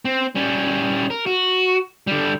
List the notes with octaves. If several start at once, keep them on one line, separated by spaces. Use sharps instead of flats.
C4
G3 C#4
A#4
F#4
D3 G3